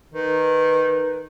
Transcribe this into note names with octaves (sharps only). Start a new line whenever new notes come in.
D#3 B4